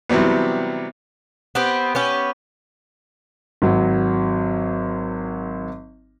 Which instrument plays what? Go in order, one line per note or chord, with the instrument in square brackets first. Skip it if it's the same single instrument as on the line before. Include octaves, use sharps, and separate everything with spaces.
[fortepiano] C3 E3 F#3 G3 B3
[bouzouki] B3 C4 G4
B3 C#4 G4
[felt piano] G#1 F#3